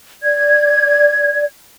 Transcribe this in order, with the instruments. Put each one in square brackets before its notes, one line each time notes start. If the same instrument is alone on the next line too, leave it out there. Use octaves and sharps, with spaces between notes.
[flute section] D5 G#6